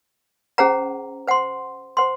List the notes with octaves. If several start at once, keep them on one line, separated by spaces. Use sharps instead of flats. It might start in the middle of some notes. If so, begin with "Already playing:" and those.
C#4 G#4 C5 F#5 A#5
C5 F#5 C6
C5 F#5 C6